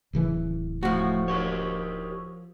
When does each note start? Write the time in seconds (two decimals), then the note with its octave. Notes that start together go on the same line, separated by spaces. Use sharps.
0.13 D1 C#3 E3
0.83 A2 F3 F#4
1.28 G4 A#4 C#5